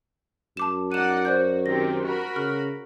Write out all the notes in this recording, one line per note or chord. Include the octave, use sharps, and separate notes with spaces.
F#2 A5 D6 E7
D#4 D5 F#5 D#7 E7
F#4 C5 D5 G6
D#3 C4 G4 A#6
F#4 A#4 B5
C#3 F6